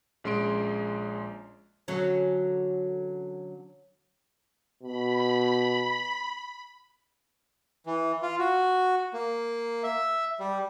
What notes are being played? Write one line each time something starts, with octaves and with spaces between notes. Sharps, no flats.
A#1 G#3 C#4 C6 D7
D3 F#3 C#4
B2 B5
E3
F4
F#4
A#3
E5
G3